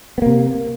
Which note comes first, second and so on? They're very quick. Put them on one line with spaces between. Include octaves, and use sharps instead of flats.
B3 A#3 C3